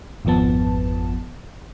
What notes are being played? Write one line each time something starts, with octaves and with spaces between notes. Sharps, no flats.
G#1 F2 F3 B3 A5